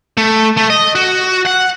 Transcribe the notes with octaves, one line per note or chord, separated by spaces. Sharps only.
A3
A3
D#5
F#4
F#5